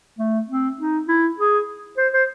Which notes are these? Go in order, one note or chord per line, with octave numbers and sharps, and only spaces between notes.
A3
C4
D#4
E4
G#4
C5
C5